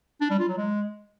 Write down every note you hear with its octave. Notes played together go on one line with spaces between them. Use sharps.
D4
G3
F4
F#3
G#3